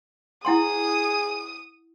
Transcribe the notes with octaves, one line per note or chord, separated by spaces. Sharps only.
E4 G#4 F#5 C6 D#6